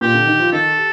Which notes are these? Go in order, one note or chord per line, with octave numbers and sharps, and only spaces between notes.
A#2 A#3 G4
D3 D4
D#3 D#4
F3 F4
D#3 D#4 A4
G4